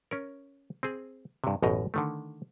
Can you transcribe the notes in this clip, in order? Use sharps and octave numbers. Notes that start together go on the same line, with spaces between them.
C#4 A#4
C4 G#4
G2 C3
A1 F#2 B2 D#5 A#5
D3 D#3 A3